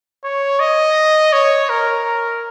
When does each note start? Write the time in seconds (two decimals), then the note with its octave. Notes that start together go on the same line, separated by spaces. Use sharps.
0.24 C#5
0.60 D#5
1.33 C#5
1.69 A#4